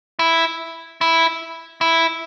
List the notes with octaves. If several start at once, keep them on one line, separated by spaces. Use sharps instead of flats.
E4
E4
E4